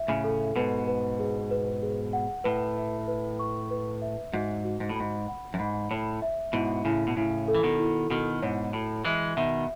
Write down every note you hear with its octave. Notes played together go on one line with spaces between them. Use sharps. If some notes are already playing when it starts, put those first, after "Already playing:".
Already playing: E5
A2 C#3
A4
G#2 B2 B4
B4
G#4
B4
G#4
F#5
A2 B4
E5
B4
C#6
B4
E5
G#2 F#4
F#4
G#2
A2
G#2 B5
F#5
F#2
G#2 B5
A2 C#5
E5
G#2 B2 E4
A2 C#3 E4
B2
A2 C#3 E4
A4
E3
B2 D#3
E4
B2 D#3 F#4
G#2 B2 C#5
A2 F#4
E3 G#3 E5
B2 D#3 E5